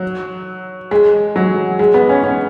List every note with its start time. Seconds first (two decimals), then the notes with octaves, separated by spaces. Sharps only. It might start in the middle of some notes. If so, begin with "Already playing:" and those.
Already playing: F#3
0.91 G#3
1.36 F#3
1.79 G#3
1.94 B3
2.09 C#4
2.23 C#4